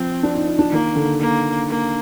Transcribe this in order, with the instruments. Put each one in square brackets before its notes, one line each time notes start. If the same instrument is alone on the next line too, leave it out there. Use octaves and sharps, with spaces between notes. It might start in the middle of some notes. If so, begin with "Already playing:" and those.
Already playing: [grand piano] F3 [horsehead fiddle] C4
[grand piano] D4
D#4
D#4
D4
[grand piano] D#3 [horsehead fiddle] A#3
[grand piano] D3
[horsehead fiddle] A#3
A#3